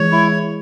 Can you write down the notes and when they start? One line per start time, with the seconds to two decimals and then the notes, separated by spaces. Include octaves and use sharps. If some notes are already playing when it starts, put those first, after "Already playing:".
Already playing: E3 G#3 C#5
0.12 E4